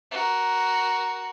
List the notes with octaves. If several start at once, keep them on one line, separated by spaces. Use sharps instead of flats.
F#4 A#4